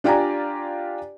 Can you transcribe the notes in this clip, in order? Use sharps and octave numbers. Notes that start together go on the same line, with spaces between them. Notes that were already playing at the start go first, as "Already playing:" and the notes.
D4 F4 G4 D5 G#5 A#5